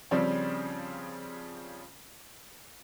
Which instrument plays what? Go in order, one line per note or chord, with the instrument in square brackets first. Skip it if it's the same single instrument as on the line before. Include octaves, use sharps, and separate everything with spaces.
[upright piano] C#3 F3 G3 C4 C#4